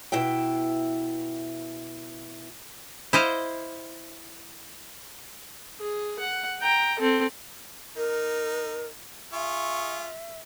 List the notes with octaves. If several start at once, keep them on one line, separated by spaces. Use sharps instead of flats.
B2 E4 E5 G5
E4 C5 D#5 F5
G#4
F#5
G5 A#5
C4 A4
D#4 A#4
F4 G#4 E5 C#6